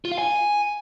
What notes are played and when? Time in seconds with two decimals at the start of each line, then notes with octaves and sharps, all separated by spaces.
0.05 F4
0.12 F5
0.18 G#5